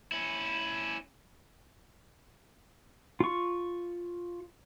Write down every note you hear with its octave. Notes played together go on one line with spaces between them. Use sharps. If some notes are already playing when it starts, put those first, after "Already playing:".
C#4 E4
F4 C#6